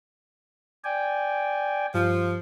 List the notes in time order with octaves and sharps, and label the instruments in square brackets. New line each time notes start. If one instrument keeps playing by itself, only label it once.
[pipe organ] D5 G5 G#5
[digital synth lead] G2 [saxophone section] F3